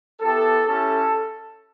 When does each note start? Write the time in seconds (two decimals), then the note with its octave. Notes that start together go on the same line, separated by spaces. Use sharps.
0.21 B3 E4 G4 A4
0.67 C#4 E4 G4 A4